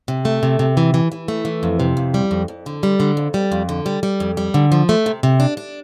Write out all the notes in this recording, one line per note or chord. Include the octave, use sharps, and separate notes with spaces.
C3
A3
C3
C3
E3
E3
E3
A3
E3
F2
C3
F2
G3
F2
F2
D3
G3
D3
F2
G3
F2
D3
G3
G3
F2
G3
D3
F3
A3
C3
C3
D4
D4